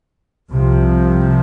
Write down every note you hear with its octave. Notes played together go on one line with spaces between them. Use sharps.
C2 C3 F3